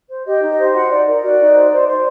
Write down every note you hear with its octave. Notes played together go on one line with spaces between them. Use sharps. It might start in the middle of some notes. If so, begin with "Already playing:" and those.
C5
G4 D#5
D#4
D#5
C5
F#4 F#5
D#4 D5
A#4
F#4 D5
D#4
C5
C5
C5